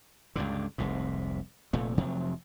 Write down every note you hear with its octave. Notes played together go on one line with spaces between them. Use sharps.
C#2 G2 D3
F1 C2 G#2
F1 A#2 A3
F1 C3 F3 F#3